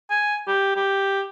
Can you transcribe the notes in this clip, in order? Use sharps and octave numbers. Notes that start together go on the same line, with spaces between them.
G#5
G4
G4